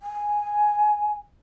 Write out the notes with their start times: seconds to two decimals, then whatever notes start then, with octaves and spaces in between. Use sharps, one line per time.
0.02 G#5